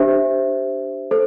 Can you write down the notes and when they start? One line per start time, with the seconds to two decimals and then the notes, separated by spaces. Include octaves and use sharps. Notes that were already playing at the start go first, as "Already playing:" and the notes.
Already playing: D4 G4 C5 E5
1.11 A4 C5